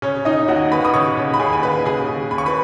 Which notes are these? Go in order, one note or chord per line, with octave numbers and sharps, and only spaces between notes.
C#3 C#4 C#5
C#3 D#4 D#5
D#2 F#4 F#5
D#2 B4 B5
D#6
C#3 C#5 C#6
C#3
B5
D#2 G#4 G#5
G#5
D#2 B4 B5
C#3 G#4 G#5
C#3
D#2 B5
C#6
B4 B5